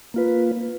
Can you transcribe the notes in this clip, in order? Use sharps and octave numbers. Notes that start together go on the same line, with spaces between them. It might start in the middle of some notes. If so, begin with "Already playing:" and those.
A#3 F4 B4